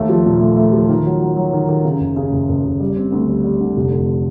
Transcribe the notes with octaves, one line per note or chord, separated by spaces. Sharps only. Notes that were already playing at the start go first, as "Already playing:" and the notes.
Already playing: D#2 A3
F3
A#2
A3
A3
F3
D#3
F#3
F#3
F#3
D#3
D#3
C#3
F#1
C#3
F#1
F#1
F#1
G3
C4
D2
G3
G3
D3
F1
F2